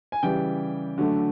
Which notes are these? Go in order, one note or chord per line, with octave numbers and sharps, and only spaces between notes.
G#5
C#3 E3 G3 G5
D3 F#3 A3